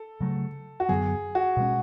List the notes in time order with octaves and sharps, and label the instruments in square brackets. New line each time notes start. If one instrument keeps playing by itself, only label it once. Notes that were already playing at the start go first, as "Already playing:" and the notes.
Already playing: [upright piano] A4
[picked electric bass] C#3 F#3 A3
[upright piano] F#4
[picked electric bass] F#2 D3 F#3 B3 [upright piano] G#4
[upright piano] F#4
[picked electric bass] B2 G#3 C#4